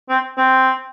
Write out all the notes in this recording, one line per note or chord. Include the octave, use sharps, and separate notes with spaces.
C4
C4